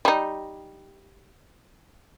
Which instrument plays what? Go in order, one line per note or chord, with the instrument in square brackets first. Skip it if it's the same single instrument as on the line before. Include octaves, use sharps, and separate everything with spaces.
[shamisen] G3 D#4